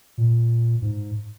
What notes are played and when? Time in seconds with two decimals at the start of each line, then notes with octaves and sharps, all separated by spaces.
0.18 A#2
0.82 G#2